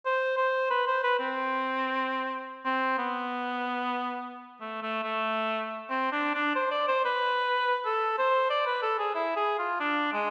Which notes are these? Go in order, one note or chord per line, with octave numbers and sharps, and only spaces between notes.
C5
C5
B4
C5
B4
C4
C4
B3
A3
A3
A3
C4
D4
D4
C5
D5
C5
B4
A4
C5
D5
B4
A4
G#4
E4
G#4
F4
D4
G#3